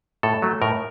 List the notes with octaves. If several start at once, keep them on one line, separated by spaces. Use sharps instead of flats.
A2 A4
F#3 A3
A2 A#4